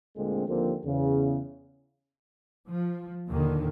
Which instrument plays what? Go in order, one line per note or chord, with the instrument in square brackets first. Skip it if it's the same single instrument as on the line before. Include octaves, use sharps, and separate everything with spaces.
[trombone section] D2 A#2 D3 G#3 C4
D#2 D3 F3 A#3 C4 G4
E2 C#3
[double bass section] F3
D#2 A#2 D3 D#3